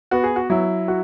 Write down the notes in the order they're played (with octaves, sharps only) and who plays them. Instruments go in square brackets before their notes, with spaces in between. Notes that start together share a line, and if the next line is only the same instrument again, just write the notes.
[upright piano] B3 [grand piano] F#4
[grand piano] G#4
F#4
[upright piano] F#3 [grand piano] E4
[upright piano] F#4